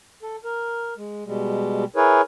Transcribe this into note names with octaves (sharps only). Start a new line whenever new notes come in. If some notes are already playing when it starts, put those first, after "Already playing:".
A4
A#4
G#3
B2 G3 G#3
E4 G#4 A#4 B4 C#5